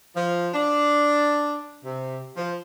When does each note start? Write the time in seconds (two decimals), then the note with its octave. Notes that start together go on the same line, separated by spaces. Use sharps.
0.16 F3
0.54 D4
1.84 C3
2.37 F3